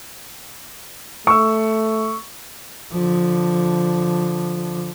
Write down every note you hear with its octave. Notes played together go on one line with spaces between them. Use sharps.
A3 C#6 E6
D3 F3